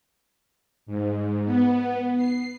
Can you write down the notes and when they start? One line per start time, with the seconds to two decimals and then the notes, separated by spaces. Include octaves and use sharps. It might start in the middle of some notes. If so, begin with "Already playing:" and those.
0.86 G#2
1.45 B3
2.16 C7